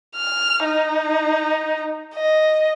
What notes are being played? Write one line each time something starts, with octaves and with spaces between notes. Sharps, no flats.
F6
D#4
D#5